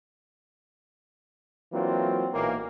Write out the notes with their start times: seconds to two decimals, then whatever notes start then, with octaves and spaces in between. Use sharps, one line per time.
1.72 E3 F#3 A#3 C4 D4 F4
2.33 B1 A#2 E3 A#3